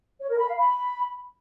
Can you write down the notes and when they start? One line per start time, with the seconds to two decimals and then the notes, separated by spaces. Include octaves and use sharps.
0.21 C#5
0.30 A#4
0.39 B5
0.48 F5
0.57 B5